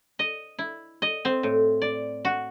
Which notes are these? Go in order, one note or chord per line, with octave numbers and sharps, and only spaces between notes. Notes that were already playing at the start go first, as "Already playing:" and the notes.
D#5
E4
D#5
C4
A2
D5
F#4